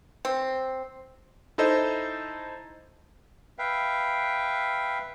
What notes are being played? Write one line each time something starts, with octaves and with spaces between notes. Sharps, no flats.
C4
D#4 E4 A4 C5 D#5
B4 E5 F5 G5